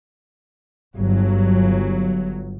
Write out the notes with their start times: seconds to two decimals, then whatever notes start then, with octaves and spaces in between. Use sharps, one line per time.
0.96 G1 F#3